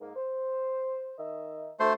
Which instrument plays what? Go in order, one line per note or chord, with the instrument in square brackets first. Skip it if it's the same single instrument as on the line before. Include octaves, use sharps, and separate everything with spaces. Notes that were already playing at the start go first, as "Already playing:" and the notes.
[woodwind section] G#2 A#3
C5
D#3 D#5 E5
[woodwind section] D2 [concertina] A3 C5